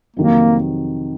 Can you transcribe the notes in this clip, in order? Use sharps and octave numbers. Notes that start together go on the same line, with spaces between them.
F2 C3 D#3 F#3 A#3